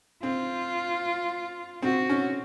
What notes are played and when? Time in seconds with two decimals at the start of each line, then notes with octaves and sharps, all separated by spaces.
0.23 C4 F4
1.83 C4 F#4
2.10 C#4